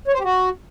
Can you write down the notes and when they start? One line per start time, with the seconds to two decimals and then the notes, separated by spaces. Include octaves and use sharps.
0.08 C#5
0.13 C5
0.19 G4
0.24 F#4